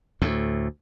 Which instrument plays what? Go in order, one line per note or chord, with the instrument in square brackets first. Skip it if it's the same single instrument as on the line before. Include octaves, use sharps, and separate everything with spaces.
[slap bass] D2 A2